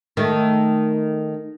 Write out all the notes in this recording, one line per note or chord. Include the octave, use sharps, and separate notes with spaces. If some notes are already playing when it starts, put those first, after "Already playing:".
D#3 A3